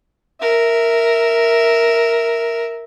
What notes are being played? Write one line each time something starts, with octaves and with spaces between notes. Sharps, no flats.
A#4 E5